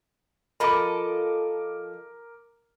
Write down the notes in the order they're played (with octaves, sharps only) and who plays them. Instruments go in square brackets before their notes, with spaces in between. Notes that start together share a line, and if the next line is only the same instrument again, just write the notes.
[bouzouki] F3 A4 D#5 [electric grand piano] A#4 D6 [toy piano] B5